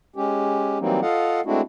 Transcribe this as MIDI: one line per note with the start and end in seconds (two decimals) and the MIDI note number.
0.16 0.78 56
0.16 0.78 61
0.16 0.78 67
0.80 1.00 52
0.80 1.00 54
0.80 1.00 55
0.80 1.00 58
0.80 1.00 60
0.80 1.00 63
1.02 1.41 65
1.02 1.41 69
1.02 1.41 75
1.02 1.41 77
1.02 1.41 78
1.46 1.61 56
1.46 1.61 57
1.46 1.61 60
1.46 1.61 62
1.46 1.61 64
1.46 1.61 66